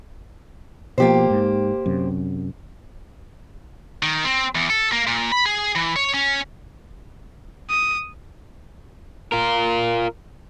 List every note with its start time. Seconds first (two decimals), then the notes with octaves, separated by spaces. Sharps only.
0.98 B2 F3 A#3 G4 C5
1.30 G#2
1.86 F#2 C3
4.03 D#3
4.25 C4
4.55 E2
4.70 A4
4.92 A#3
5.07 A#2
5.32 B5
5.46 G#4
5.75 E3
5.96 C#5
6.14 C#4
7.70 D#6
9.32 F4 A#4